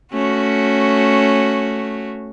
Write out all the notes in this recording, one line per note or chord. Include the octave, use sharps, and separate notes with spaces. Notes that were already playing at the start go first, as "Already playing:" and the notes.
A3 C#4 F#4